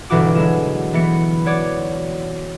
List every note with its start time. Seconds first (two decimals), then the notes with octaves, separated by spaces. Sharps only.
0.10 G1 B2 E3 F#4 D6
0.35 D3 F#3 G#3 E7
0.93 E3 B3 C#7
1.46 F#4 C#5 D5